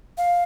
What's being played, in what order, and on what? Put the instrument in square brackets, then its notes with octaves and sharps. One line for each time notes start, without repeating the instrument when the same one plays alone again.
[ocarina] F5